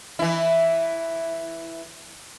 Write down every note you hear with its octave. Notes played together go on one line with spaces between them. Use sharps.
E3 E4